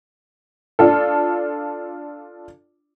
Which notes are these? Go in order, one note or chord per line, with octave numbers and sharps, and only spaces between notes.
D4 F4 A4